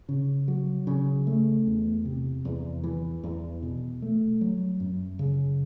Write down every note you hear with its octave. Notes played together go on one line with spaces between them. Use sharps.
C#3
F#3
C#3
A3
E2
C3
E2
E3
E2
B2
A3
F#3
F#2
C#3